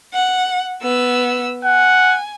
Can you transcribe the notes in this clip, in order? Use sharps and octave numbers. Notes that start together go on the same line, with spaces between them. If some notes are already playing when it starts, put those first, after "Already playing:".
F#5
B3 E6
F#5 G#5